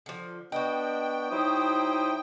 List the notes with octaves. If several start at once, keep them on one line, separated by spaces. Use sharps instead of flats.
D3 F3
B3 D4 F#4 D#5 G5
F#3 D#4 E4 C5 D#6